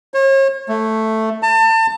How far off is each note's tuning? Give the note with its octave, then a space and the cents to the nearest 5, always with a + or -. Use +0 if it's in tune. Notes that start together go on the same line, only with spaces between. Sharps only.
C#5 -40
A3 +5
A5 +35